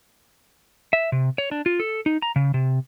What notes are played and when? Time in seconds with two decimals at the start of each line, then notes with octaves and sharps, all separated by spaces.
0.93 E5
1.12 C3
1.38 C#5
1.51 D4
1.66 F4
1.80 A4
2.06 D#4
2.22 A#5
2.36 C#3
2.54 C3